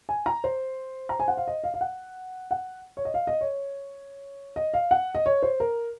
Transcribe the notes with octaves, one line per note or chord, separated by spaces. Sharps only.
G#5
A#5
C5
A#5
G#5
F#5
F5
D#5
F5
F5
F#5
F#5
C#5
D#5
F5
D#5
C#5
D#5
F5
F#5
D#5
C#5
C5
A#4